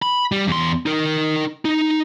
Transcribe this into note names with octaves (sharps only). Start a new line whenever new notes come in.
B5
G3
E2 C6
D#4 A#4
D#4